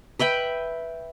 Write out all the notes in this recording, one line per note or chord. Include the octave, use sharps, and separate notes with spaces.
B4 E5 G5 B5